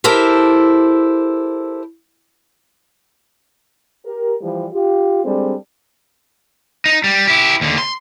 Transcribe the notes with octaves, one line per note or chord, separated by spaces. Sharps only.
E4 G4 A4 A#4 C5
G4 A#4
E3 F3 G3
F4 G4
G3 G#3 C4 D4 A4
D#4
G3
E4 G4
D#2 D3
C6